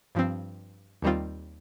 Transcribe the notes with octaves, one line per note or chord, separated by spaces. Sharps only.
G2 F3 C4
D#2 D#3 G3 C4 F4